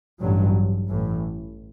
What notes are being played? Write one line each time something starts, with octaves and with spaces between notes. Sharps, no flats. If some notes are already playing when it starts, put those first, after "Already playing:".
A1 G2 F#3
A1 A2 E3